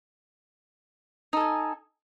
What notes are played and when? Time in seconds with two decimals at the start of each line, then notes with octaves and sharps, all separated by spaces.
1.33 D#4
1.37 A4
1.40 G#5